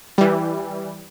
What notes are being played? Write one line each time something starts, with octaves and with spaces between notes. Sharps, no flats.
E3 G3